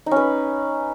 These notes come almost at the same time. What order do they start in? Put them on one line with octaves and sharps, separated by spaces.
D#4 C#4 B4